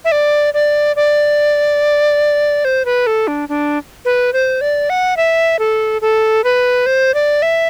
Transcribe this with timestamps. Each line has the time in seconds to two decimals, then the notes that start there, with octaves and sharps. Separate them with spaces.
0.05 E5
0.12 D5
0.54 D5
0.96 D5
2.65 C5
2.85 B4
3.07 A4
3.28 D4
3.49 D4
4.05 B4
4.33 C5
4.61 D5
4.90 F#5
5.17 E5
5.59 A4
6.02 A4
6.44 B4
6.86 C5
7.14 D5
7.42 E5